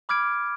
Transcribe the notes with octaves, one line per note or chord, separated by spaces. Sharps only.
B5 D6 F6 G#6 D7